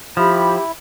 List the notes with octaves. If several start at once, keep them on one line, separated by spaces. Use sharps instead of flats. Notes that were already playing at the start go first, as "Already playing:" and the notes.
F3 E4 G4 B5